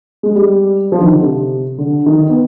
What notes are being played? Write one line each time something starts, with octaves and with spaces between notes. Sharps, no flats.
G#3
G3
F3
D#3
D3
C3
D3
D#3
B3